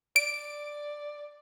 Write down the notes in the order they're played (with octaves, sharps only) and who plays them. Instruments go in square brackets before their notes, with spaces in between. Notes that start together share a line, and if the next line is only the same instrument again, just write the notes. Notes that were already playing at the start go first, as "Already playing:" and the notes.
[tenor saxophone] D5 [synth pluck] D7